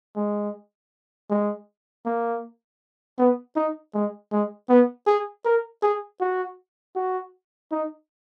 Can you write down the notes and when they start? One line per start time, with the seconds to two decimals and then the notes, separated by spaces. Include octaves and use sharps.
0.16 G#3
1.30 G#3
2.06 A#3
3.18 B3
3.56 D#4
3.95 G#3
4.32 G#3
4.69 B3
5.07 G#4
5.45 A#4
5.83 G#4
6.21 F#4
6.96 F#4
7.71 D#4